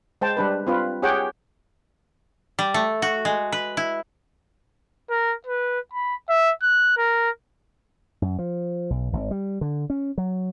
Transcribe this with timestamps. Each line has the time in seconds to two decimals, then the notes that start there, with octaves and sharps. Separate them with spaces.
0.21 G#3 C5 G5 A5
0.37 G3 D4 B4
0.67 C4 F4 B4
1.02 G4 G#4 C#5 F#5 G5
2.59 G3
2.74 A3
3.02 F#4
3.25 G#3
3.52 B4
3.77 E4
5.10 A#4
5.46 B4
5.93 B5
6.29 E5
6.62 F#6
6.97 A#4
8.22 F#2
8.39 F3
8.90 B1
9.13 G#1
9.31 G3
9.61 D3
9.90 C#4
10.18 F#3